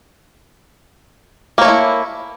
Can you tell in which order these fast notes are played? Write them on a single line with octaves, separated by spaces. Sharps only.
A#3 C#5 A3 E4